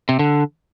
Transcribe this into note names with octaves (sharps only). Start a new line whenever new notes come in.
C3
D3